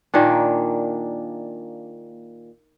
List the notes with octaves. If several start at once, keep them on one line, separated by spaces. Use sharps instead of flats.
A#2 D#3 A#3 D4